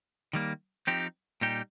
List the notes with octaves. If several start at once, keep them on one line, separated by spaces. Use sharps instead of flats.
D#3 G3 A#3
F3 C4 D#4 G4
A#2 G3 D#4 G4